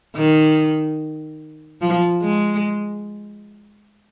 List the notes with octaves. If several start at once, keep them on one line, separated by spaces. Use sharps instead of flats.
D#3
F3
G#3